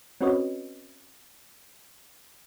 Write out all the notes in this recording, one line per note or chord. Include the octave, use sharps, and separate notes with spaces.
C4 C#4 F#4 B4 C#5 D#5